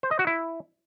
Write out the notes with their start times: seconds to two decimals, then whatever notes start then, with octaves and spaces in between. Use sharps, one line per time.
0.03 C5
0.11 D#5
0.19 F#4
0.27 E4